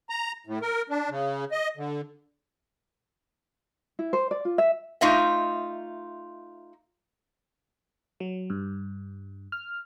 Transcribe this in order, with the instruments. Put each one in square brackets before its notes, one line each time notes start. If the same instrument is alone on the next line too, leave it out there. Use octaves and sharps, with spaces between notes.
[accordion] A#5
A2
A#4
D4
C#3
D#5
D3
[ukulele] E4
C5
D5
F4
E5
[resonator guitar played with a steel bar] A3 D#4 F4 D#5 E5
[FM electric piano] F#3
G2
F6